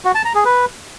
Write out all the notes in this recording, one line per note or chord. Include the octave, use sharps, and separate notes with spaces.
F#4
A5
A#5
G#4
B4